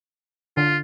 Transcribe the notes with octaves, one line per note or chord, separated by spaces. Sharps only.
D3 F4